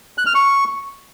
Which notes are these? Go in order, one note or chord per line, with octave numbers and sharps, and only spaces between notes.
F#6
F6
C#6